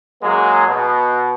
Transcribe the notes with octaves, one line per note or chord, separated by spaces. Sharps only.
F#2 F#3 G#3 A#3 G#4
B2